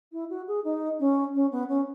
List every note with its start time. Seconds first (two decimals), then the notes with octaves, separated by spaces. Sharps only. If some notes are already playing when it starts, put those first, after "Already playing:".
0.12 E4
0.30 F#4
0.48 G#4
0.64 D#4
1.00 C#4
1.34 C#4
1.52 B3
1.69 C#4